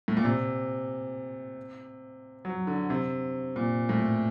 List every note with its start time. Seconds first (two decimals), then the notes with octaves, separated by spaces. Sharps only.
0.08 A2
0.17 A#2
0.25 C3
2.45 F#3
2.67 D3
2.90 C3
3.56 A#2
3.89 A2